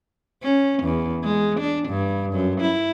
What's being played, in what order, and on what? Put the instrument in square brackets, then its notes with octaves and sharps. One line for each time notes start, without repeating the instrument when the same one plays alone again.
[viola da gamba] C#4
E2
G#3
D4
G2
F#2
E4